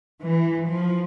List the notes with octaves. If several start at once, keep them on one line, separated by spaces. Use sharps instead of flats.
E3
F3